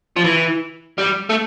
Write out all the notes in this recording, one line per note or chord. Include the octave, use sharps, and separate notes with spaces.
F3
E3
G3
A3